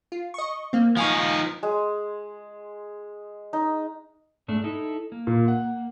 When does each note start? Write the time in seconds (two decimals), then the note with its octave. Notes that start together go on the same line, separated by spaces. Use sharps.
0.12 F4
0.34 D#5 C#6
0.73 A#3 C4
0.97 F3 D#4 F5 G#5 C#6
1.63 G#3
3.53 D#4
4.48 G#2 A3 D4
4.64 D#4 E4 A4
5.12 A#3
5.27 A#2
5.48 F#5